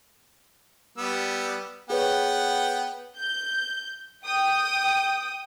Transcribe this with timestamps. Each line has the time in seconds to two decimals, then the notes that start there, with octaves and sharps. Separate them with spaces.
0.98 G3 B3 E6
1.90 B3 G#4 B4 C#5 F#5 G5
3.16 G6
4.25 G5 D#6